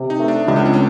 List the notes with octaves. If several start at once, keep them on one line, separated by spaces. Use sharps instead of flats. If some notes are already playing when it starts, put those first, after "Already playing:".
Already playing: C3
D#4
A3
D4
C#2 D4
C#4
C4
C#4